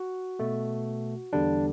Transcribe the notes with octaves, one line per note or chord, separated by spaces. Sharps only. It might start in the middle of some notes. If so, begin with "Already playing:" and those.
Already playing: F#4
B2 A3
E2 D3 G3 D4